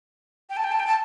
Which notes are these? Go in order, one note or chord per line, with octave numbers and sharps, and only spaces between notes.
G5
A5
G5
A5
G5
A5